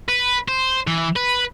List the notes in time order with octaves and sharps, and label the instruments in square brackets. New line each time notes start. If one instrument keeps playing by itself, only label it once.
[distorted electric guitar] B4
C5
E3
B4